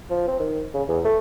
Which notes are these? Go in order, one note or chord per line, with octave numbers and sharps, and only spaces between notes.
F3
C4
D#3
C#3
E2
A3